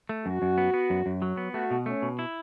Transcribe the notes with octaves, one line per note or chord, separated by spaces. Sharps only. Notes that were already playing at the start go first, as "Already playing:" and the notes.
A3
F#2 F#4
F#2
B3
B3
F#2
F#2
F#3
B3
A3 F#4
B2
A3 C#4
B2
E4